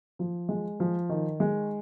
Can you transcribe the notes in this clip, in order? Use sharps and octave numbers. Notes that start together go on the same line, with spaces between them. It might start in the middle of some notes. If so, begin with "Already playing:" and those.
F3
G#3
F3
D#3
G#3